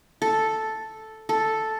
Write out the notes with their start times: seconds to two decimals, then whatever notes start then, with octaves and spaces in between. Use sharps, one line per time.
0.22 A4
1.29 A4